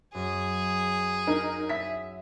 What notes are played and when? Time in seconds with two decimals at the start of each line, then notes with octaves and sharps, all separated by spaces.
0.15 F#2 G#4
1.27 D#4 A#4
1.69 E5 B6